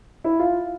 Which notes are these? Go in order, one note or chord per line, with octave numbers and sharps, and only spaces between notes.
E4
F4